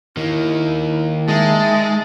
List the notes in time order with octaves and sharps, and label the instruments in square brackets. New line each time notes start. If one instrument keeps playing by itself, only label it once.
[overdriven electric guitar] D#3 A#3 [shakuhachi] E4
[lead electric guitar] G#3 [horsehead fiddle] D#4 A5 [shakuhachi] E5